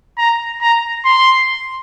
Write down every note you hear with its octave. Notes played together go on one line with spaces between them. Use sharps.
A#5
A#5
C6